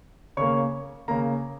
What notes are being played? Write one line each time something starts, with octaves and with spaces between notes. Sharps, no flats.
C#3 A#3 C#5 C#6
C#3 A#3 A#5